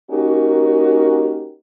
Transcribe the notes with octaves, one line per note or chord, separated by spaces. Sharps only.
A#3 C#4 D#4 F#4 G4 A#4